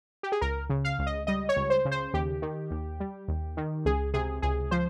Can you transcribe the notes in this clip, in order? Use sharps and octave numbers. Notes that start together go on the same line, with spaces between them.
G4
G#4
C#2 A#4
C#3
F5
C#2
D#5
G3 D#5
C#5
C#2
C5
C#3
C5
D#2 G4
D#3
D#2
G3
D#2
D#3
C#2 G#4
C3 G#4
C#2 G#4
F3 C5